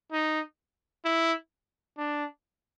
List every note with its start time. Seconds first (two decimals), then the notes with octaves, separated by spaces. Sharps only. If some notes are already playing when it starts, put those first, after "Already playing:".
0.12 D#4
1.05 E4
1.97 D4